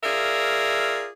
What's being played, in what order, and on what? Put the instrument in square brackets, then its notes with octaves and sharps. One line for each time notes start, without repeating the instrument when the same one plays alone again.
[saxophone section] F4 G#4 A#4 D5 E5